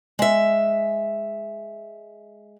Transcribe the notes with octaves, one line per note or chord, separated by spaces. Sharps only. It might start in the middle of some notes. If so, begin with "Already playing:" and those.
G#3 E5